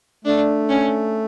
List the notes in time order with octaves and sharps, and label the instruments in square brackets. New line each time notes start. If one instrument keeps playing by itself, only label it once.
[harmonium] A3 [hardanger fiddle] D4
[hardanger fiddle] C#4